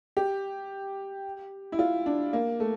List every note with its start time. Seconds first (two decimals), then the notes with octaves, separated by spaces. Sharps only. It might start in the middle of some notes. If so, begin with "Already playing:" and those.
0.17 G4
1.72 E4
1.79 F4
2.06 D4
2.33 A#3
2.60 A3